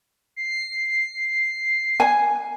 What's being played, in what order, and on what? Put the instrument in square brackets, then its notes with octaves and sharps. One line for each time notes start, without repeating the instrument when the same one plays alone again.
[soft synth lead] C7
[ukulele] G#5